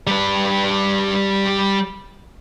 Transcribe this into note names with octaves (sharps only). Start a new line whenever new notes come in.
G3 B4